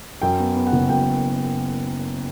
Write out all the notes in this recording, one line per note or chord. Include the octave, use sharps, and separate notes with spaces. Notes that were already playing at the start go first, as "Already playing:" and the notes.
F#2 G5
B3
B3
F#5
F#1
F#2 G5